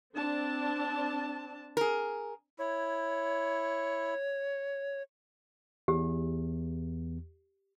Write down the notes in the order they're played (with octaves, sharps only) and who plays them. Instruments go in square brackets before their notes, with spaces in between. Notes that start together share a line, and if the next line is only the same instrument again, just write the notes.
[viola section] C4 D4 A5
[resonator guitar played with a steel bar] G#4 A#4
[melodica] E4 [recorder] C#5
[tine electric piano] E2 [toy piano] G4